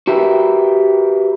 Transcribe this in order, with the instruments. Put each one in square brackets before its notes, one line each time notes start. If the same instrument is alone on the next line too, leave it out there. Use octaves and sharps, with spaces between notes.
[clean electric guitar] F#4 G4 A#4 B4 E5